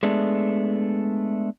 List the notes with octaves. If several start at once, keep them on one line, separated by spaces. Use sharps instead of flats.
G#3 A3 B3 D4